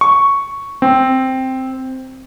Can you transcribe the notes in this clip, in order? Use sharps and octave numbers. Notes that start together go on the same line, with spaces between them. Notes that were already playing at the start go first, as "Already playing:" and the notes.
C#6
C4